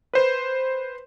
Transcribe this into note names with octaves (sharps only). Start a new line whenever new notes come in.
B4 C5